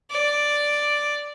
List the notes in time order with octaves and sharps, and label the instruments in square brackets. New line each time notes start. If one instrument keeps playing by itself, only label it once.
[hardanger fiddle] D5